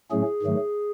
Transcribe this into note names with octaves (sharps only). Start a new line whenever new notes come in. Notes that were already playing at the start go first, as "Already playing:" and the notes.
A2 F#3 A3 C#4 G#4
G#2 D#3 F#3 A3